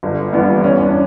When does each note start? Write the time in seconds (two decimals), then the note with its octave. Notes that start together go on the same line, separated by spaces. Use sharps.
0.03 G1
0.33 G2 E3 B3
0.62 E2 C#4
0.83 D4